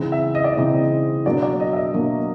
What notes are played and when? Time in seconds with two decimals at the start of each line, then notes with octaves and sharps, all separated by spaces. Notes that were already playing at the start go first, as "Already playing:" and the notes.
Already playing: C#3 E3 G#3 C4 D#4
0.12 E5
0.35 D#5
0.44 D5
0.53 C#3 E3 G#3 C4 D#4 D#5
1.25 B2 F#3 A#3 D4 D5
1.43 D5
1.60 D#5
1.73 E5
1.76 D#5
1.94 B2 F#3 A#3 D4